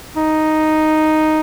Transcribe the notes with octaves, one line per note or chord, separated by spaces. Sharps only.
D#4